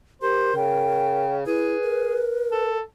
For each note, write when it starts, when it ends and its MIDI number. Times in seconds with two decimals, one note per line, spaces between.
0.22 0.55 67
0.22 1.26 70
0.22 0.55 72
0.55 1.42 49
0.55 1.35 79
1.46 1.77 64
1.46 2.22 68
1.46 2.69 71
1.82 2.77 70
2.52 2.81 69